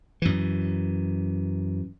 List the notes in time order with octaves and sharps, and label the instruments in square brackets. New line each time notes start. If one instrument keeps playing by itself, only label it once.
[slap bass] F#2 E3